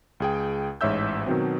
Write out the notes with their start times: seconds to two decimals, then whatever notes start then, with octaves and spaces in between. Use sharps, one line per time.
0.20 C#2 G#4 G5
0.81 A1 G#2 C#5 E5 E6 G6
1.26 B2 D#3 F#3 C4